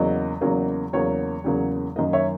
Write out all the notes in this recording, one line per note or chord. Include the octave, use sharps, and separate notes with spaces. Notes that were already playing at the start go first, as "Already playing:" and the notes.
Already playing: E2 C#3 F#3 A#3 D#5
E2 C#3 F#3 A#3
E2 C#3 F#3 A#3 C#5
E2 C#3 F#3 A#3
F#2 D#3 A#3 D#5
C#5 E5